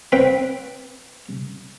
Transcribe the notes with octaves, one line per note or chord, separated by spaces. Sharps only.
C4 B4 G5 B5